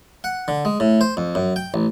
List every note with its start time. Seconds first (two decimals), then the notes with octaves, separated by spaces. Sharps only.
0.24 F#5
0.48 D3
0.65 G#3
0.80 A2
1.01 C5
1.17 F2
1.35 F#2
1.56 G5
1.74 A1